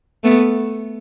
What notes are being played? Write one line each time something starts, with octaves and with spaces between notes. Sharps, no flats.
A3 B3